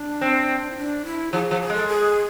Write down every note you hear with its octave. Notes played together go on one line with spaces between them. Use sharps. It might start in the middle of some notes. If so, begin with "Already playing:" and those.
Already playing: D4
C4
E4
D4
E4
F3 G#4
F3
G#4
G#3 A4
G#4